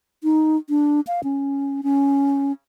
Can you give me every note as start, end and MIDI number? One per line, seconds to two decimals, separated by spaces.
0.23 0.56 63
0.69 1.00 62
1.07 1.20 77
1.24 1.81 61
1.83 2.52 61